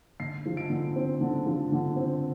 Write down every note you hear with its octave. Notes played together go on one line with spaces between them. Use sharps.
D3 C7
F3
D7
D3
C4
D3
F3
D3
C4